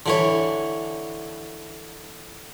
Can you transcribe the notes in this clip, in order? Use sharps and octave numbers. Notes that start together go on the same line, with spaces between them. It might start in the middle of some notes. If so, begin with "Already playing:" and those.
D3 E3 C#5